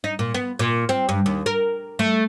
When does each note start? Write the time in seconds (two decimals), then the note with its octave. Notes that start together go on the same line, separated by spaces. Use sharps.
0.04 D#4
0.19 A#2
0.34 B3
0.59 A#2
0.89 C4
1.09 G2
1.26 D#2
1.46 A#4
1.99 A3